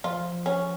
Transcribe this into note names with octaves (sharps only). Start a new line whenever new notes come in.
F3 F4
C#4